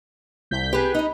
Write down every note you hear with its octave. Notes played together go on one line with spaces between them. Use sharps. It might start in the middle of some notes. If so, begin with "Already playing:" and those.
C2 G6 B6
G4 G#4 B4
D#4 D#5